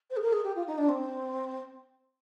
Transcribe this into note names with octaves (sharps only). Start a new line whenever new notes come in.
C5
G#4
A#4
G#4
G4
F4
D#4
D4
C4